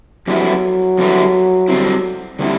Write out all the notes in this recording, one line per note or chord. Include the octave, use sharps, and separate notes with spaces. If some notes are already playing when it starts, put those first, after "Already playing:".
F2 D3 F#3 G3 B3 E4
F2 D3 G3 B3 E4
D3 G3 C4 E4
D3 G3 C4 E4